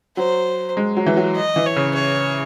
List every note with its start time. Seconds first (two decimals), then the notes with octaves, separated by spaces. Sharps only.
0.17 F#3 C5
0.77 G#3
0.97 F#3
1.06 E3
1.17 F#3
1.36 D#5
1.56 E3
1.66 C#5
1.76 C#3
1.95 C#5